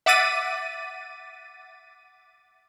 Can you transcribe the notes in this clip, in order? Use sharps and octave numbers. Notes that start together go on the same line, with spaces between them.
E5 F#5 D6 A6 B6 D#7